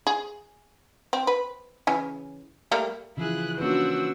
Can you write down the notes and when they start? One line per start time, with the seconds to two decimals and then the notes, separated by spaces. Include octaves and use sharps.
0.07 G#4
1.13 C4
1.27 B4
1.87 C#3 E3 G#5
2.71 G3 A3 A#3
3.17 C#3 E3 F3 E4 F4 G#4 F#6
3.58 A#3 C#4 D4 F4 F#4 B4 C5 E6